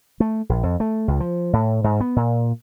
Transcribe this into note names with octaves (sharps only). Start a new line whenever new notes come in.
A3
A#1
F2
A3
C#2
F3
A2
G#2
B3
A#2